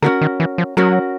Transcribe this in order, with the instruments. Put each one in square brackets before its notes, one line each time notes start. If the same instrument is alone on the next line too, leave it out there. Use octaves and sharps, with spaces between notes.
[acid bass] D3 [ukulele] C#4 F#4 A#4
[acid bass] D#3
E3
F3
[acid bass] F#3 [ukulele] C#4 F#4 A#4